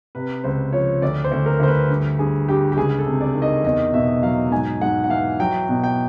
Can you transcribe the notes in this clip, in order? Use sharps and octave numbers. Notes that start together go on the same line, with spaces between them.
C3 B4
C#2 C5
F3 C#5
D2 D5
C5
D2
A#4
D2 C5
B4
G2
G2 G#4
G2 G4
G4
C#2 G#4
A4
C3
D5
D#3
D#5
E2 D#5
B2 E5
F#3 F5
G#2 G#5
G#2 F#5
F#5
E3 F5
F#3 G5
B2
G5